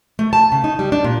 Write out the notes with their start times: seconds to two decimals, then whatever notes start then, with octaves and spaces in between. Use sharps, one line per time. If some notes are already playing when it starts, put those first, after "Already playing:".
0.19 A3
0.33 A5
0.52 C#3
0.64 D#4
0.79 G3
0.92 D4
1.04 A#2